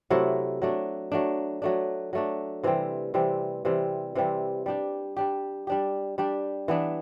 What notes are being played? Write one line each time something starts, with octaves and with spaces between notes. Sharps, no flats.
C3 F#3 A3 E4
F#3 A3 D4
F#3 A3 D4
F#3 A3 D4
F#3 A3 D4
C3 E3 G3 C4
C3 E3 G3 C4
C3 E3 G3 C4
C3 E3 G3 C4
G3 D4 G4
G3 D4 G4
G3 D4 G4
G3 D4 G4
E3 B3 D4